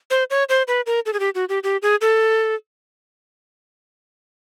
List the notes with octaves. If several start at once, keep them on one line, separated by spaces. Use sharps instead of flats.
C5
C#5
C5
B4
A#4
A4
G#4
G4
F#4
G4
G4
G#4
A4